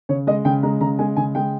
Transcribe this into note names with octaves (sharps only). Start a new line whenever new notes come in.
C#3 C#5
G#3 D#5
C#3 G5
G#3 A#5
C#3 A#5
G#3 G#5
C#3 G#5
G#3 G5